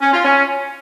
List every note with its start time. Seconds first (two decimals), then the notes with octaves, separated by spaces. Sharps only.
0.01 C#4
0.13 F4
0.25 C#4